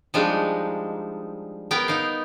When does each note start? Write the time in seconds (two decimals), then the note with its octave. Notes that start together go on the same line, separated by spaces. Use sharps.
0.14 F3 G3 G#3 D4 D#4
1.71 B3 A#4 G5
1.88 D#4 F5